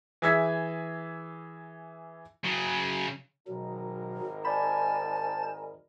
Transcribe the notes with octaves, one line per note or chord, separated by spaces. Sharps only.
E3 G#4 E5 E6 G#6 B6
C#3 F#3
G#1 B2 F#3 D#4 A#4
C5 D5 G#5 A5 B5 A6